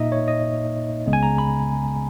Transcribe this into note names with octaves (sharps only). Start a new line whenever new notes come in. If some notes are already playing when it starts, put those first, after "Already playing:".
Already playing: A#2 A#3 D#4 D#5 E5
C#5
D#5
C#2 C#3 G#3 B3
G#5
A#5
B5